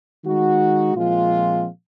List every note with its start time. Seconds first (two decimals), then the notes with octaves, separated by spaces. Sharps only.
0.24 D#3 G#3 D#4 F#4
0.95 A#2 F3 G#3 C4 F4